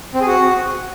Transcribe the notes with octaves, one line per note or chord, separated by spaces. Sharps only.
C4
G#4
F#4